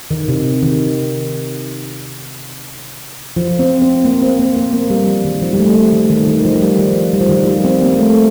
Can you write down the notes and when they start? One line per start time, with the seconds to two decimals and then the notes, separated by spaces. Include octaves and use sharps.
0.11 D#3
0.28 C3
0.63 D#3
3.37 F3
3.59 C4
3.82 C4
4.04 A#3
4.22 C4
4.39 A#3
4.56 A#3
4.73 A#3
4.90 G3
5.07 F3
5.25 D#3
5.42 F3
5.53 G3
5.59 A3
5.76 G3
5.93 D#3
6.10 D#3
6.27 D#3
6.45 F3
6.62 G3
6.79 F3
7.13 G3
7.21 F3
7.29 D#3
7.37 F3
7.47 G3
7.64 C4
7.82 A#3
7.98 A3